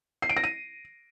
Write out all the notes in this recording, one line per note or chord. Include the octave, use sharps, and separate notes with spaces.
C7
D7
A#6
D#7